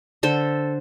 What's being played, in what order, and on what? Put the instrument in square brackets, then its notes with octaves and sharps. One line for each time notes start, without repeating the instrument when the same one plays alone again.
[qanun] D3 A4 C5